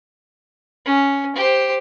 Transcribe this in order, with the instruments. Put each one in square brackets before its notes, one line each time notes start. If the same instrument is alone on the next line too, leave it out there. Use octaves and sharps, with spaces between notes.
[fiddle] C#4
G4 C5